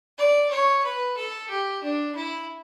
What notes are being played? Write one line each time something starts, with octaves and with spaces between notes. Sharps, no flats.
D5
C#5
B4
A4
G4
D4
E4